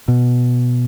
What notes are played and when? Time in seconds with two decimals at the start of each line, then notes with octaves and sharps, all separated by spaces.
0.08 B2